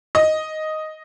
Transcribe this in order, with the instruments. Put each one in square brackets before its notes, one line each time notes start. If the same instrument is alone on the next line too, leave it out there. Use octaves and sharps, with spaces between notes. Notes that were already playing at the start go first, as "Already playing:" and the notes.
[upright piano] D#5